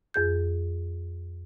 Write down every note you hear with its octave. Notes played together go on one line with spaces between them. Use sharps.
F2 G#4 G6